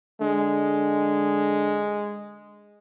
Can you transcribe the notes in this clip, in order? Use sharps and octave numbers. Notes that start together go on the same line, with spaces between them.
D3 G#3